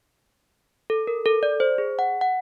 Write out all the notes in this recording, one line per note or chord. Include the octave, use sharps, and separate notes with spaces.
A4
A#4
A4
D5
C5
G#4
F#5
F#5